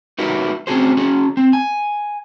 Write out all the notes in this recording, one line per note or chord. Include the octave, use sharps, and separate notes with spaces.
D#4 E4 F#4 A#4 B4
C4 C#4 D#4 F#4 G#4 C5
C#4 F#4 G#4
C4
G#5